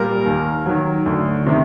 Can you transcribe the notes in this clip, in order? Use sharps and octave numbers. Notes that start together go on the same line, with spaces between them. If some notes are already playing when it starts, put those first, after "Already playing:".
Already playing: A#2 G3 A#4
D#2
D#3 F#3
D2
C3 D#3